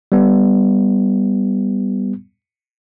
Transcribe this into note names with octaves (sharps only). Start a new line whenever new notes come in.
G3 B3